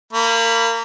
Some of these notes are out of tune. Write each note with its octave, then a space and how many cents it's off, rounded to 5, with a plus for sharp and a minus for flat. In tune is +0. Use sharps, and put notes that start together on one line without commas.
A#3 -25 B5 +0